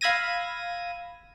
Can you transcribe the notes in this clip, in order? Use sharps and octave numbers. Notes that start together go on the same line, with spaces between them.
F5 B5 E6 G#6 A#6 D#7